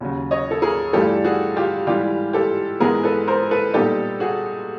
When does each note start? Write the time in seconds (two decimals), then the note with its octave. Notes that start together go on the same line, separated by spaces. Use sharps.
0.01 D#2 C#3 F#3
0.31 C#5 D#5
0.51 A4
0.62 G#4 A#4
0.93 G2 E3 A3 D4 F4 G4 A4
1.25 F#4 G#4
1.56 F4 G4
1.87 G#2 E3 G3 F4 G4
2.33 G4 A4
2.80 G#2 E3 G#3 B3 G#4 A#4
3.03 A4 B4
3.28 A#4 C5
3.51 A4 B4
3.73 A#2 G3 B3 D#4 G4 A4
4.20 F#4 G#4